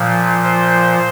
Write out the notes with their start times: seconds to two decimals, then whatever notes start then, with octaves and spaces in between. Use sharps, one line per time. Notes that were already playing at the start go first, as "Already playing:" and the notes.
Already playing: A#2 F3
0.44 C5